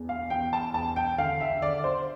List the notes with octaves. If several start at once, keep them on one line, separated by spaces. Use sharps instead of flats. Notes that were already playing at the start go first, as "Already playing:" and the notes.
Already playing: E1 E2
F5
E2 G5
A5
E1 A5
G5
D3 F5
E5
D3 D5
C5